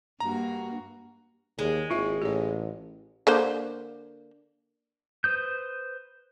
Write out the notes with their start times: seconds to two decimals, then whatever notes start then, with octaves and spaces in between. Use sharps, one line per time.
0.20 G2 A#3 F#4 A#5
1.59 D#2 G#3
1.90 G#1 E4 F4 E5
2.22 A1 G4 C#5
3.27 D3 A#3 C5
5.24 B4 C5 D#6 G6